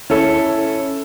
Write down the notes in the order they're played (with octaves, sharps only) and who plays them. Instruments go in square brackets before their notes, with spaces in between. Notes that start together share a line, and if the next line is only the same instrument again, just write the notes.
[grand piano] C#4 E4 A4